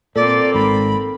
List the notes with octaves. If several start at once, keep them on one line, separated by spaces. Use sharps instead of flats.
A#2 A#3 C4 A4 D5
G#1 G#2 B5